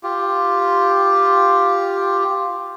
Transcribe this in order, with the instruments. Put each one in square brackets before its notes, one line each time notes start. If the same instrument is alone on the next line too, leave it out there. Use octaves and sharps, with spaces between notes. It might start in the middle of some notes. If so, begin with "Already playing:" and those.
[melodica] F4 G4